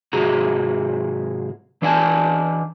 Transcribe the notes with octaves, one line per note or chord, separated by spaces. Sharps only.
G#2 C3 F#4 G#4 A#5
E3 D4 D5 E5 G#5 A5